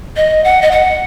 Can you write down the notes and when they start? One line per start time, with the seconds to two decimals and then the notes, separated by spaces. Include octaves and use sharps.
0.17 D#5
0.44 F#5
0.62 D#5
0.71 F#5